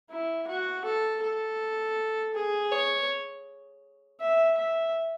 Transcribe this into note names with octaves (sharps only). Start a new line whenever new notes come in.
E4
F#4
A4
A4
G#4
C#5
E5
E5